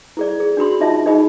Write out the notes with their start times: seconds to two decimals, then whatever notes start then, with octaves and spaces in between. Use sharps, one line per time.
0.17 E4 G#4 D5
0.40 G#4
0.57 D4 F#4 B5 C6
0.81 D#4 F4 D#5 E5 A5
1.06 D#4 G#4 D#5 B5